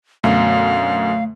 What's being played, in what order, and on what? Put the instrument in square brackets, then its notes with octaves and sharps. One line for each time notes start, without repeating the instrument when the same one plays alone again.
[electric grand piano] F#2 B2 D3 [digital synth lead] A3 [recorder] F5